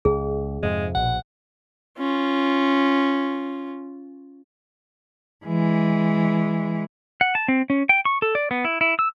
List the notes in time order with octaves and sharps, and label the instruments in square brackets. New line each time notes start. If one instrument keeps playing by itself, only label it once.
[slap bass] C#2 [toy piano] G#4
[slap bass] F2 G#2 C3 [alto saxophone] G#3
[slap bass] A#1 B2 [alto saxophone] F#5
[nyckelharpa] C#4 F4
[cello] E3 G#3
[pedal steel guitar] F#5
A5
C4
C#4
G5
C#6
A4
D5
B3
E4
E4
E6